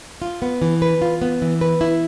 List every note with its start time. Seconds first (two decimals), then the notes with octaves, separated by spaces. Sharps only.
0.22 F4
0.42 B3
0.62 E3
0.82 B4
1.02 F4
1.22 B3
1.42 E3
1.61 B4
1.81 E4